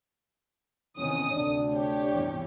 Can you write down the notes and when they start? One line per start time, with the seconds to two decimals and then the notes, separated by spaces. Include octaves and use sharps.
0.98 E2 C3 D#3 C#4 D#6
1.32 D2 C3 D4
1.73 G4 C#5
2.13 E2 G2 C3